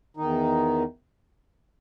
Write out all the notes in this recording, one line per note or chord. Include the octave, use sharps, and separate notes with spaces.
E2 D#3 D#4